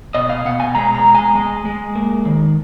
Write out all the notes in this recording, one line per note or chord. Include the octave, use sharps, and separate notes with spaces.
B2 D#5
F5
B2 F#5
G#5
G#3 A#5
A#5
G#3
G#5
G#3 G#5
G#3
A#3
D#3